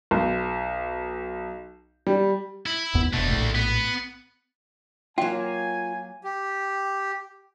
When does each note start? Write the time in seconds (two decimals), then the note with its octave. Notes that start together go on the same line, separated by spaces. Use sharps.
0.11 B1
2.07 G3
2.66 E4
2.94 F#1 D#2 B3
3.13 F1 B2 D3 A3
3.30 A#1 A2
3.55 B3
5.18 F#3 A#3 F4 G5 G#5
6.24 G4